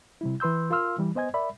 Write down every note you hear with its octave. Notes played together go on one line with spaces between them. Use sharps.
C3 G3 E4
E3 B4 C6 E6 G6
F4 A#4 F5 C6 E6 F6
E3 G3
B3 C5 D#5 G#5 G#6
A#4 D5 E5 B5